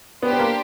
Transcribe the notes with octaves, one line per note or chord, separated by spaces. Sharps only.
B3 D4 G4 C5
B3
A#3